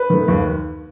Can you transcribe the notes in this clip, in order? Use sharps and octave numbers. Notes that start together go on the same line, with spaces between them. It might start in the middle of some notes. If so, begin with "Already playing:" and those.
Already playing: B4
D#3 A3
D#2